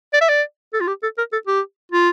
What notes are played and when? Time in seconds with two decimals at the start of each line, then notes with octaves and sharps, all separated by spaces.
0.13 D5
0.21 E5
0.29 D5
0.73 A4
0.81 F4
0.88 G4
1.03 A4
1.18 A#4
1.32 A4
1.47 G4
1.92 F4